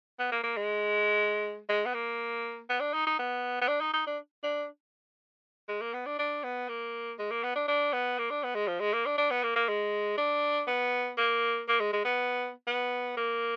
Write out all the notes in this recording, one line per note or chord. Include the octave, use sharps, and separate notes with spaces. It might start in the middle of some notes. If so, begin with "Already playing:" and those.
B3
A#3
A#3
G#3
G#3
B3
A#3
B3
D4
D#4
D#4
B3
B3
D4
D#4
D#4
D4
D4
G#3
A#3
B3
D4
D4
B3
A#3
G#3
A#3
B3
D4
D4
B3
A#3
D4
B3
G#3
F3
G#3
A#3
D4
D4
B3
A#3
A#3
G#3
D4
B3
A#3
A#3
G#3
G#3
B3
B3
A#3